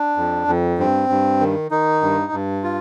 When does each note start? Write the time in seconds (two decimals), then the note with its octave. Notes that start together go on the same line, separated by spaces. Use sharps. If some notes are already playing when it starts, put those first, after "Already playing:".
Already playing: D4
0.17 F2
0.48 F2
0.78 G2 C4
1.09 G2
1.41 D#3
1.71 D#3 D#4
2.02 G2
2.32 G2
2.64 F4